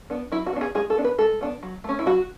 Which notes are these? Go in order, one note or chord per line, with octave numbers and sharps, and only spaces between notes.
B3 D4
F#3 E4
F#4
B3 D4
G#4
G#3 G#4
A4
B3 D4
B4
G#3 A4
B3 D4
F#3
A3 C#4
E4
F#3 F#4